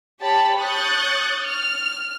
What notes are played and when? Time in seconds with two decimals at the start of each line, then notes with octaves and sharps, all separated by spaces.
0.21 G4 C#5 A5 B5
0.59 C#5 C#6 D#6 F#6 G6 A6
1.44 F6